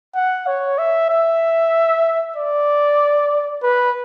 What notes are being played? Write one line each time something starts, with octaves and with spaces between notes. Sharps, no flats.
F#5
C#5
E5
E5
D5
B4